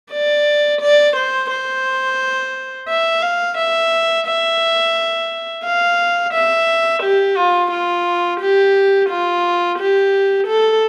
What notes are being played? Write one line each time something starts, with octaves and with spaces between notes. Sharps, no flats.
D5
D5
C5
C5
E5
F5
E5
E5
F5
E5
G4
F4
F4
G4
F4
G4
A4